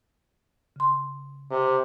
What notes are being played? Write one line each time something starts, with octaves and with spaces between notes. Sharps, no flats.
C#3 C6
C3